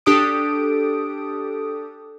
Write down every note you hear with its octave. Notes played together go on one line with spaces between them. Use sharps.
D4 G4 A4 D#6 D7